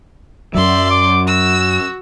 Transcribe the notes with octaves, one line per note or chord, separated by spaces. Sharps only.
F#2 F#3 D5 E5 C6
D6
F#4 E6